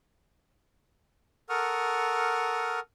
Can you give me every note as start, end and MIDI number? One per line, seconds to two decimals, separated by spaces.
1.49 2.80 69
1.49 2.80 70
1.49 2.80 78
1.49 2.80 85
1.49 2.80 87
1.49 2.80 89